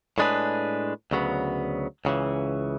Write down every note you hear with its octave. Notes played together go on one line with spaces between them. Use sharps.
A2 G#3 D4 G#4 B4
D2 C#3 F#3 B3
C#2 C#3 E3